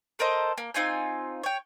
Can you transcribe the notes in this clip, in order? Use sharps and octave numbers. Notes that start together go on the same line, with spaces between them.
A4 A#4 C5 D#5
A#3
C4 D#4 F4 G#5
C#5 G5